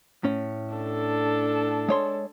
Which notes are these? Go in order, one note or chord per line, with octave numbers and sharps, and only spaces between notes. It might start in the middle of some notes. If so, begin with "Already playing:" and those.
A2 C#4
D4 A4
G#3 C#5 C6